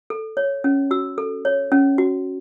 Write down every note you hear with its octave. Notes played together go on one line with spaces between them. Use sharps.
A4
C#5
C#4
F#4 E6
A4
C#5
C#4
F#4